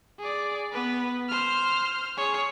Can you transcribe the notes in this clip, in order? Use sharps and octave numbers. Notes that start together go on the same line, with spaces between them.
G#4 D5
B3 B4
C5 F6
G#4 C#5